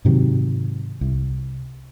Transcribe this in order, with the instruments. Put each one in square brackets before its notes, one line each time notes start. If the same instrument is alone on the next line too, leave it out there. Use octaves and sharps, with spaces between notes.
[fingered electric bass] G#2 C3 D#3 F#3
C2